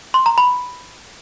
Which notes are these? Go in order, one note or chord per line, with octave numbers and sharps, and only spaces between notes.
C6
A#5
B5